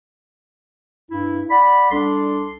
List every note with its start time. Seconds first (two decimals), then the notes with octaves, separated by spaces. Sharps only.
1.11 G2 E4
1.51 D5 F#5 B5
1.91 C2 D4 A4 C6